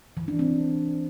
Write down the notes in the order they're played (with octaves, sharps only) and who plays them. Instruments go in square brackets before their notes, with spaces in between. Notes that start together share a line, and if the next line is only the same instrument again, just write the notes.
[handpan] E3
D4
C4